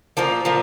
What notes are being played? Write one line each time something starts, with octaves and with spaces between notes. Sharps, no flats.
A#2 F3 A#3
A#2 F3